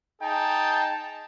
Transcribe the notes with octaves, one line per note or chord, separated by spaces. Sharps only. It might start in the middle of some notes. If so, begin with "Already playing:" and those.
D#4 G#4 G5 A5